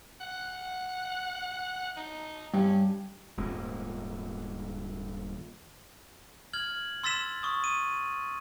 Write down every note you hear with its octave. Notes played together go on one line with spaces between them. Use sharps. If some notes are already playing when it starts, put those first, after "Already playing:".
F#5
D#4
G2 C#4
D#1 G#2 G#3 A#3
F6 G#6 F#7
C6 E6 A6 B6 E7
C#6 D#6
D#7